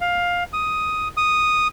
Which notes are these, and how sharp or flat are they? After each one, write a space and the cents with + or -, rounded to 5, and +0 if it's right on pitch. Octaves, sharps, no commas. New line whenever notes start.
F5 +15
D#6 +5
D#6 -5